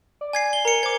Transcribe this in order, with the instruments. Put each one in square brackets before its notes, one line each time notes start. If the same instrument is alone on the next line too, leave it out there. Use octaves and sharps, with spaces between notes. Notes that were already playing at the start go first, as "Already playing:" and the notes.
[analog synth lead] D5
[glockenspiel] G#5 G#6 C7
G7
[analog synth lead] A#4 [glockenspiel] A#5 C#7
[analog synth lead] C5 [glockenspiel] D6 G#6